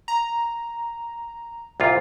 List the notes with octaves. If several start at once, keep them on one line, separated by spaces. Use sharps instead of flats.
A#5
C2 A#2 F4